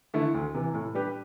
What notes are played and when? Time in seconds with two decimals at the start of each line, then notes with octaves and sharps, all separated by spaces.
0.14 D3 A3 E4
0.34 D2
0.54 C3 E3
0.74 A2
0.95 G3 D4 G4 B4